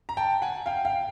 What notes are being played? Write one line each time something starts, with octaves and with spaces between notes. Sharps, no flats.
A#5
G5 A5
F#5 G#5
F5 G5
F5 G5